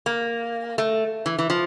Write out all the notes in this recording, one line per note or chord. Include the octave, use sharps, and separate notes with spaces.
A#3
A3
E3
E3
F3